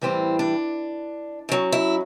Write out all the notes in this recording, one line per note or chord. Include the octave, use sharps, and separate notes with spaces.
A2 E3 G3 C4
D4
F#2 F#3
E4